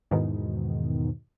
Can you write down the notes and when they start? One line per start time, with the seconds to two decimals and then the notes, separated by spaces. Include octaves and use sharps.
0.11 E2 G#2 B2 D#3